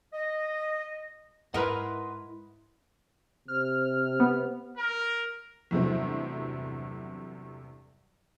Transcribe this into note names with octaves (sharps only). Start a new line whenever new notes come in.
D#5
G#2 E4 A#4 B4 D#5 F#5 C6
C3 C5 F6
B3
A#4
E2 G2 C3 F#3 A3 C4